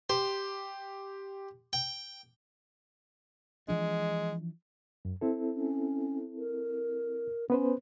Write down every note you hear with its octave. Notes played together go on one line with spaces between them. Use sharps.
G4 C5
G5
E3 F3 G#3 D4
F#2
C4 E4 A4
C#4
A#4
B3 C#4 B4 C5